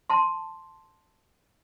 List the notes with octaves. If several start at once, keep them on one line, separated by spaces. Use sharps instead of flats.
A5 C6